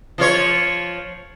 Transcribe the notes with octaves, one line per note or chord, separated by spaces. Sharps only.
F3 F4 C#5